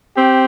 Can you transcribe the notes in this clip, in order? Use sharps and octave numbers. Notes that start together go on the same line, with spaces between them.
C4 G4